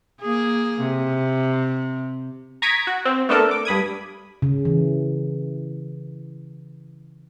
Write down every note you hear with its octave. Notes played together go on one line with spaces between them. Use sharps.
A#3 G#4
C3
A#5 C#6 D#6 G#6 B6 D7
F#4
C4
A3 B3 D4 A4 A#4
D6
G2 B5 D#6 G#6
C#3
E3